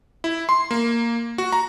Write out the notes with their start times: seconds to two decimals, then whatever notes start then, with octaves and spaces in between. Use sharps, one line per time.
0.24 E4
0.49 C6
0.71 A#3
1.38 F#4
1.53 A#5